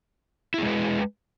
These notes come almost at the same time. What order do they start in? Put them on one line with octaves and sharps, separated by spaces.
E4 G#4 G#3 B4